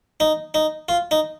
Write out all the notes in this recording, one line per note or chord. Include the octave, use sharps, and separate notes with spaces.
D#4
D#4
F4
D#4